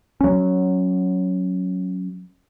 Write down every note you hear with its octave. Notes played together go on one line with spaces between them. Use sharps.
F#3 C#4